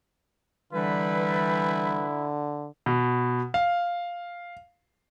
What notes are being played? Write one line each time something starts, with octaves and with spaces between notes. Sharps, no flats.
D3 E3 G3 E4 B4
B2
F5